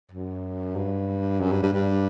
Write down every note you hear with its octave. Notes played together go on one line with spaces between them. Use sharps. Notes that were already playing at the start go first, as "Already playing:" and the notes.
F#2
G2
F#2
G2
G2
G2